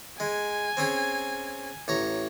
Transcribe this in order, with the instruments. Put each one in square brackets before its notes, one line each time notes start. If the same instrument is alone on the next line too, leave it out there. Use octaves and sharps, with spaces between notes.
[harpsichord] G#3 [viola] G#5
[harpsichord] C4 C#4 G#4
A1 C#5 A#5